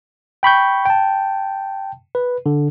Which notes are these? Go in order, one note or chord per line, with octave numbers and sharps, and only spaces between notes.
G5 B5 C#6 G6
G5 A5
B4
D3